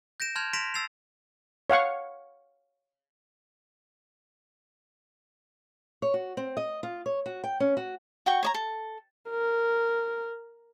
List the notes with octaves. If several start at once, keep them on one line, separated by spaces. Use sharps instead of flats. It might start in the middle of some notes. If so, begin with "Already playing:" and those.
G6 A#6 D7 E7
A5 C6 F6 G6 G#6 F7
C6 A#6 B6 D7 E7 F7
E6 A6 C7 F7
C#5 F5 F#5 C#6
C#5
F#4
C4
D#5
F4
C#5
F#4
G5
C#4
F#4
F#4 G5 C#6
C#5 D5 A#5
A4
A#4